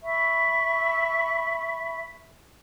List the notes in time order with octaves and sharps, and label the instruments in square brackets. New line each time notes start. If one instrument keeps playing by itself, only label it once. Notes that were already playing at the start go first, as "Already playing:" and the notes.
[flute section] E5 B5 C#6